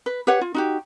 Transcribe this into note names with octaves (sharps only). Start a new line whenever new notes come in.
B4
G4 B4 C#5 F#5
F4
D#4 F#4 G4